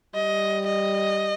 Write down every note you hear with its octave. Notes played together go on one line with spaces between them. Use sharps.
G3 D#5
D#5